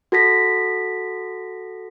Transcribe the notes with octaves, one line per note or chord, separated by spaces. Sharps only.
F#4 A4 A#6 B6